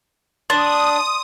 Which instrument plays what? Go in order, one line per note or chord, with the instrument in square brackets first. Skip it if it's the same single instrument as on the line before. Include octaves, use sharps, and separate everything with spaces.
[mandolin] D4 [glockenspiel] C6 [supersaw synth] D#6